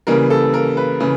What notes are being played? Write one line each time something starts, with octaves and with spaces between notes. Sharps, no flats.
C#3 E3 G3 A#3 A#4
A4
A#4
B4
C#3 E3